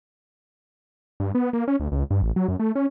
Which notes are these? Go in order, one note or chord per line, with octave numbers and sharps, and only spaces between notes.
G2
B3
A#3
C#4
D2
C#2
G2
A1
F#3
F#2
A3
C#4